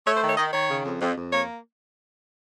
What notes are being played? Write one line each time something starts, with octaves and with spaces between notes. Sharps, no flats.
A3 C#5
C5
D#3
C#5
D#3 D#5
D#3 C#5
C#3
F2
F2
F2
A#3 C#5